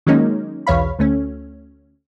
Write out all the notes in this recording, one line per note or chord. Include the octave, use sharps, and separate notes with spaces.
D#3 F#3 G#3 A#3 C#4 D#4
B1 E2 C#5 F5 B5
D2 A3 C#4